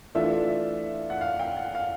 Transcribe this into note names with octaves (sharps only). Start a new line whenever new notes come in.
E3 A3 D4 F4 E5
F#5
F5
G5
F#5
F5